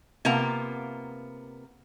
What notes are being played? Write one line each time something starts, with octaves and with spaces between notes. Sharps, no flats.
C3 A#3 B3 F4 A#5